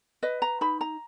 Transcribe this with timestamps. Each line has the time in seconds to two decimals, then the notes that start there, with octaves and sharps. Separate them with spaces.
0.23 B4 D#5
0.42 A#5
0.61 D#4 B5
0.81 A#5